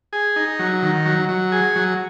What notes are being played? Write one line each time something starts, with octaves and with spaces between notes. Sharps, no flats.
G#4
D#4
F#3
D#3
F#3
F#3
G#4
F#3